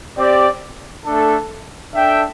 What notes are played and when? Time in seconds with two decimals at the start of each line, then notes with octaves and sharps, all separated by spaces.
0.17 C4 G4 D5
1.05 A3 D4 A4
1.93 D4 A4 E5 G5